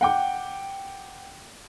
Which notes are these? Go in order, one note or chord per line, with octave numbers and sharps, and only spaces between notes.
F#5 G5 D6